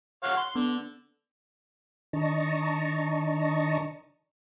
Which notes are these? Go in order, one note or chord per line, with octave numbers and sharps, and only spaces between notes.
C#5 F5 F#5
C6
D3 B3
D#3 D4 D#5 A5 A#5 C#6